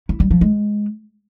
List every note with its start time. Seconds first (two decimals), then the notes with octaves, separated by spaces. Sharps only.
0.09 E4
0.20 G3
0.31 F3
0.41 G#3